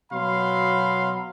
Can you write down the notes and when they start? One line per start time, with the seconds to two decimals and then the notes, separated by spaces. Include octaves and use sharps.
0.12 B2 F#3 F5 B5 C6